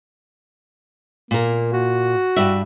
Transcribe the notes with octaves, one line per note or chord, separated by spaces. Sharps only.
A#2 A#3 A#4
F#4
G2 D5 E5